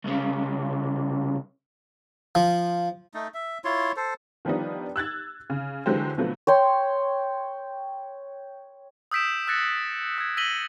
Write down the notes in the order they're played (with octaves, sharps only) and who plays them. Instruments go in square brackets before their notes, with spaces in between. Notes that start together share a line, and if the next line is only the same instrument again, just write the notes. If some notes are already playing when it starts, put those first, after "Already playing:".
[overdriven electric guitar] C2 C#3
[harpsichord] F3
[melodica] A3 D#4
E5
E4 F4 C#5 C6
A4 C5
[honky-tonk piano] D#3 F3 G3 B3 D4 D#4
E6 F#6 G#6 A6
C#3
D3 E3 F#3 G#3 G4 C5
B2 D3 F3 F#3 A3 B3
[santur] C#5 G5 C6
[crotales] D#6 E6 G6 B6 D7 E7
E6 F#6 A6 A#6 C#7
E6 G#6
E6 A#6 B6 D#7 F#7 G7